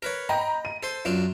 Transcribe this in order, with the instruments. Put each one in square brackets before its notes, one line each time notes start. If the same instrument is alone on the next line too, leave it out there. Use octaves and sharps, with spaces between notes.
[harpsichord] A#4 B4 C#5
[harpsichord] D#5 [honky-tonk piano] G5 A#5 B5
[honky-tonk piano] D#7
[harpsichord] A4 C5 C6
F#2 D4 F4